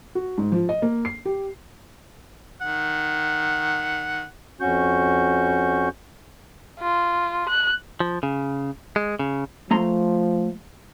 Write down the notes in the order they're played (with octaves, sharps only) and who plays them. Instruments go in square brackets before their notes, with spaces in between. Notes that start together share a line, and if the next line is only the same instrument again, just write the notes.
[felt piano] F#4
G#2
F3
D#5
A#3
C7
G4
[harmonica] D#3 F#5
[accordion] F2 C#4 F#4 C#6 G6
[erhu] F4
F#6
[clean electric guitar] F3
C#3
G#3
C#3
[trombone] F3 [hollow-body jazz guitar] A3 A#5 C6